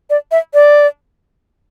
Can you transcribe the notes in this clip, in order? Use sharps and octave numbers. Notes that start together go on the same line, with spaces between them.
D5
E5
D5